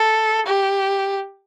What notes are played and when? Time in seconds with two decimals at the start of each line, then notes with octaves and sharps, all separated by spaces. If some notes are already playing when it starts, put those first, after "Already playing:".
Already playing: A4
0.47 G4